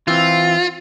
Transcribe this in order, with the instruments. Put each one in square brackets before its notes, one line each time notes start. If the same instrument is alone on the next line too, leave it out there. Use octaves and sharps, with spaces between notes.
[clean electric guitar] E3 C4 [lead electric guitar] F4